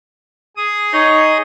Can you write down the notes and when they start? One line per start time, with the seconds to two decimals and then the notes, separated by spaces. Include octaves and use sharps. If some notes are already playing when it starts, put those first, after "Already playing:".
0.57 G#4 D#6
0.94 D#4 C#5